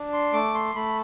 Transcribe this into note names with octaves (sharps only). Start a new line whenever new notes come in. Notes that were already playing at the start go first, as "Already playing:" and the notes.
Already playing: D4
C6
A3 D6
C6
A3 B5